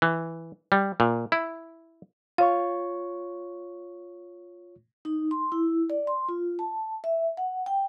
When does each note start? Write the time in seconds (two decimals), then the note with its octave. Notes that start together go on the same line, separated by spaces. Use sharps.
0.02 E3
0.72 G3
1.00 A#2
1.32 E4
2.38 F4 C#5 F5 C#6
5.05 D#4
5.31 C6
5.52 E4
5.90 D5
6.07 C6
6.29 F4
6.59 A5
7.04 E5
7.37 F#5
7.66 G5